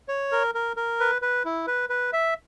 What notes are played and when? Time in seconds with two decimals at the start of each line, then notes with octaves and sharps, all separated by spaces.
0.08 C#5
0.32 A#4
0.55 A#4
0.77 A#4
1.00 B4
1.22 B4
1.45 E4
1.67 B4
1.89 B4
2.13 E5